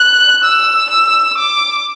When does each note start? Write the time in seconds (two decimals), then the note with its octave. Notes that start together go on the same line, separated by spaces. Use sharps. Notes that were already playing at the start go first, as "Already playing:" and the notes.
Already playing: F#6
0.44 E6
0.90 E6
1.37 D6